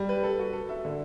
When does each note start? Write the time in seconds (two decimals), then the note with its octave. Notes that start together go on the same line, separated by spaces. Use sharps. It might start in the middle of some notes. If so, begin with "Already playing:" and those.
Already playing: G3
0.09 B4
0.23 A4
0.39 F#4
0.53 A4
0.69 E5
0.85 D3